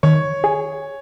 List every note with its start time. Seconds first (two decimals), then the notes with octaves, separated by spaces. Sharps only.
0.03 D#3 C#5
0.44 G#4